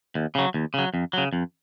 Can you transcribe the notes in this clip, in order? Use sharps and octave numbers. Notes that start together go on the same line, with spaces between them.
D#2
C#3 F#3
D#2
C#3 F#3
F2
C#3 F#3
F2